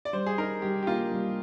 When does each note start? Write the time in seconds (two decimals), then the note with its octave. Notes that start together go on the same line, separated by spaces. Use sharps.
0.05 D5
0.13 G3 C5
0.26 G#4
0.38 D#4 A#4
0.62 G3 G4
0.82 G4
0.87 A#3 F4
1.12 G3